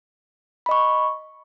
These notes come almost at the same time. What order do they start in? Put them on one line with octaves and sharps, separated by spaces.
B5 D#5 C#6